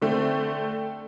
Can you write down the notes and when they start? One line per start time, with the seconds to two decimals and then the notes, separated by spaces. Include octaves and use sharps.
0.02 D3 A3 C4